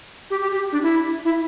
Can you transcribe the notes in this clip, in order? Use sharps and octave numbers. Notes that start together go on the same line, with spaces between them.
G4
G4
G4
D4
E4
E4